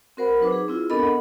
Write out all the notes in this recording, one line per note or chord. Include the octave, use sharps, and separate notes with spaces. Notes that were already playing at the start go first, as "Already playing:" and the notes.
C4 F#4 A#4 C5 F#5 B5
F#3 D#4 B4 D6
G#4
C4 E4 F4 G#4
B3 D4 A4 A#4 D#5 B5
D#5 F#5